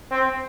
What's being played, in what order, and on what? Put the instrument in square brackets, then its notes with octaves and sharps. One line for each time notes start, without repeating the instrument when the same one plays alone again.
[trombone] C4